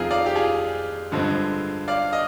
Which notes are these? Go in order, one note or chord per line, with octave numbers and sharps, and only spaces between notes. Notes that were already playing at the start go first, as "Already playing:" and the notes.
Already playing: F2 C3 F3 C4 D#4 F4 G#4
D5 F5
G4
F4 G#4
G2 D3 F3 G#3 C4
D5 F5
D#5